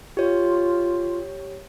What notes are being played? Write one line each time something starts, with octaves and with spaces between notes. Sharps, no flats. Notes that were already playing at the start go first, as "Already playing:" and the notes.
F4 G4 C#5